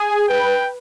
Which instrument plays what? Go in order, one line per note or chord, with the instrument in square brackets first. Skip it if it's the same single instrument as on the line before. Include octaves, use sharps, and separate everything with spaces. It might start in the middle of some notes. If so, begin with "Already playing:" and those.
Already playing: [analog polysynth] G#4 [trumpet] G#5
[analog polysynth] B4 [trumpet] G5